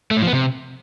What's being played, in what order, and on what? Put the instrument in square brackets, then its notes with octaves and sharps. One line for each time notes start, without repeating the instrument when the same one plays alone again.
[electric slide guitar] A3
A2
F3
B3
C3